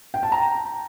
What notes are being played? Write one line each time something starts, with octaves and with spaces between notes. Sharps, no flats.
G5
A5
A#5